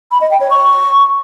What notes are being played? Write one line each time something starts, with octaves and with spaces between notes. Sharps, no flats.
B5
D#5
G5
C#5
C#6